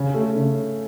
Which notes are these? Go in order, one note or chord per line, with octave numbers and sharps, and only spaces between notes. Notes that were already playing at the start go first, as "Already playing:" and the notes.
Already playing: C#3
A3
C#3